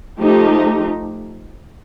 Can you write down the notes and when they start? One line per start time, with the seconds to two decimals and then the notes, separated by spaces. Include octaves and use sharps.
0.20 F3 A3 D#4 G4